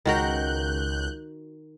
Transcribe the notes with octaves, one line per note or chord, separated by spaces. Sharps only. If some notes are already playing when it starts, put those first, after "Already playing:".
C#2 D#3 F#4 A#4 F#6 G6